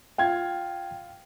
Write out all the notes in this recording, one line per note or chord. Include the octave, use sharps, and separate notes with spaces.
F4 G5 G#6